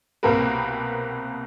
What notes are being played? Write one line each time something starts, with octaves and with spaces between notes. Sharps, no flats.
C2 B2 A#3 C4 A#4 B4